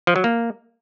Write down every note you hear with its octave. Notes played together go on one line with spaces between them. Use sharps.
F3
F#3
A#3